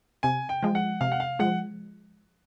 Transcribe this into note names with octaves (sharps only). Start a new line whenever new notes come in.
C3 G#5
G5
F3 G#3
F#5
C3 F5
F#5
F5
F3 G#3 F#5